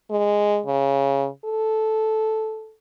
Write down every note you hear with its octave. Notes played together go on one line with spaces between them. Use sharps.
G#3
C#3
A4